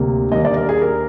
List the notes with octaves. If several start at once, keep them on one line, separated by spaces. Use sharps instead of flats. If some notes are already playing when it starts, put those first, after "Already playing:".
Already playing: D2 C3 G3 A#3
D#2 D3 G3 A#3 D#5
D5
A#4
G#4
A#4